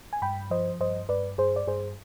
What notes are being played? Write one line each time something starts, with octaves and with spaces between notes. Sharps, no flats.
G#5
G2 G5 B5
F3 C5 D#5
G2 C5 D#5
G2 B4 D5
G2 G#4 C5
D5
G2 G#4 C5